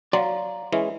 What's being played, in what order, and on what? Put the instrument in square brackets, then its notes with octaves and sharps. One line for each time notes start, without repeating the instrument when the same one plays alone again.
[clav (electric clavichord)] F#3 [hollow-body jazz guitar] D5 C6 [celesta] F5 A#5
[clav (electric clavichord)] E3 G#3 C#4 [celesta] E5